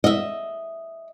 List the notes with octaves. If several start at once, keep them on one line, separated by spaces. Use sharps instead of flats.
D#5 E5